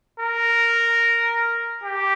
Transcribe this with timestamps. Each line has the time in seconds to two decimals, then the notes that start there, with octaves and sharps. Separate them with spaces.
0.20 A#4
1.84 G4